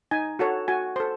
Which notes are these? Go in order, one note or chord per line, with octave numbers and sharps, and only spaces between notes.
D#4 G#5
F#4 A4 C#5 F#5
F#4 G#5
A4 C5 C6